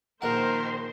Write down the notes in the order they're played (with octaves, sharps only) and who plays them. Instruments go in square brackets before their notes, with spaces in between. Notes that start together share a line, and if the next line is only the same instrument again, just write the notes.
[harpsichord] A#1 F#5 [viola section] D#3 C5 C6 [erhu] A#4